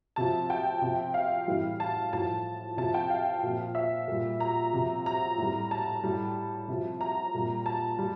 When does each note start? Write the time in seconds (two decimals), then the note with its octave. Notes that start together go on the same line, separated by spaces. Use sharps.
0.16 C3 F3 A5
0.50 G5
0.82 C3 F3
1.14 F5
1.48 A2 E3 G3
1.80 A5
2.13 A2 F3 A5
2.77 C3 F3 A5
2.94 G5
3.10 F5
3.43 A#2 F3
3.75 E5
4.08 A#2 G3
4.40 A#5
4.73 C3 F3
5.06 A#5
5.38 A2 G3
5.71 A5
6.04 A2 G3
6.68 C3 F3
7.01 A#5
7.34 A#2 G3
7.66 A5
7.99 G3